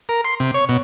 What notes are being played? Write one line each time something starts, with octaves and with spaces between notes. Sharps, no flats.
A#4
C6
C3
C#5
B2